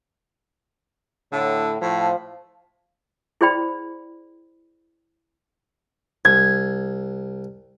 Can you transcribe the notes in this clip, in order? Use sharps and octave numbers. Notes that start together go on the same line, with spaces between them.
A2 D3
A2 F3
E4 G#4 C5 D5 G5 B5
C2 G#6